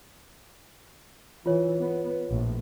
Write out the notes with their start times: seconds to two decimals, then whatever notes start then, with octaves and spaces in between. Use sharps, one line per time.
1.46 E3 F4 C#5
1.80 B3
2.29 A#1 A2